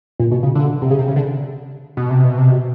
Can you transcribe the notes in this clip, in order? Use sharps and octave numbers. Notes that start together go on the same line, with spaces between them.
A#2
B2
C#3
D3
C3
C#3
C3
C#3
D3
B2
C3
B2
C3
B2